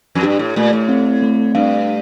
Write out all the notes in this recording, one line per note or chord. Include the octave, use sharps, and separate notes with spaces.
F2
G2 G4
A2
A#2 A3
A2
C4
A3
G2 F5